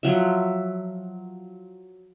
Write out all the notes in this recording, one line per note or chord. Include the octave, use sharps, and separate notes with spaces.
F3 F#3 E5